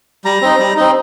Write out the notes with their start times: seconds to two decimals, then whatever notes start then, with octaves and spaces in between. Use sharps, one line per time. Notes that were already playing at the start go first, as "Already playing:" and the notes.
0.25 G3 A#5
0.42 C4 D#4
0.59 G3
0.77 C4 D#4